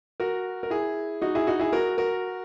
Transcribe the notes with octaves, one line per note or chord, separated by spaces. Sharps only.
F#4 A#4
A#4
E4 G#4
D#4 F#4
E4 G#4
D#4 F#4
E4 G#4
F#4 A#4
F#4 A#4